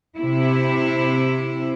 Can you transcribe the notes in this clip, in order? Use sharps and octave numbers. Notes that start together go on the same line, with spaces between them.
C3 E4